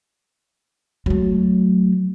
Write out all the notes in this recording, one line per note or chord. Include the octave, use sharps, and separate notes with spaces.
F#3 A3